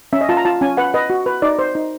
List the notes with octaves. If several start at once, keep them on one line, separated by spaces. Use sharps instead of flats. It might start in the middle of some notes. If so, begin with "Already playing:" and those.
C#4 E5
D#5
F4 A5
A#5
F4 A5
C#4 G#5
B4 F#5
B4 D#5
F#4
B4
D#4 D5
C5
D#4